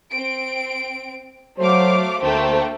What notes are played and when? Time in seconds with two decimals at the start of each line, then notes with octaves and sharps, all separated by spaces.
0.11 C4 D7
1.59 F#3 A3 C5 F5 D6
2.22 D2 A3 A#3 C5 G5